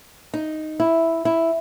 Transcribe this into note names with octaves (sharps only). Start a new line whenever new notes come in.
D#4
E4
E4